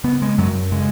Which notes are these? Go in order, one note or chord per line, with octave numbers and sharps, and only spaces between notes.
C#3 B3
G#3
F#2 F#3
C#3 G#3